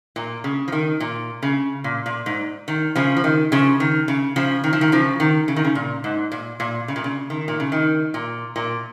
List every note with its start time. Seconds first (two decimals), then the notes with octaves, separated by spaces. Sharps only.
0.16 A#2
0.44 C#3
0.68 F3
0.72 D#3
1.00 A#2
1.42 C#3
1.84 A#2
2.06 A#2
2.26 G#2
2.68 D#3
2.95 C#3 F3
3.17 F3
3.24 D#3
3.52 C#3 F3
3.80 D#3
4.08 C#3
4.36 C#3 F3
4.64 D#3
4.73 F3
4.81 D#3
4.92 C#3 F3
5.20 D#3
5.48 C#3
5.56 D#3
5.65 C#3
5.75 A#2
6.04 G#2
6.32 A#2
6.60 A#2
6.88 C#3
6.96 A#2
7.04 C#3
7.30 D#3
7.48 A#2
7.60 C#3
7.72 D#3
8.14 A#2
8.56 A#2